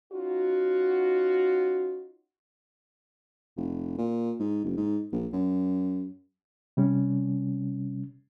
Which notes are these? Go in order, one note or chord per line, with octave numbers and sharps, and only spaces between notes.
C#4 D#4 F4 F#4
F1
A#2
G#2
F#1
G#2
A#1
F#2
C3 G3 C#4